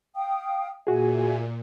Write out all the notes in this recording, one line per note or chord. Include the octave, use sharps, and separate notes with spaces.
F5 G5 D#6
A#2 F#4 G#4 E5 G#5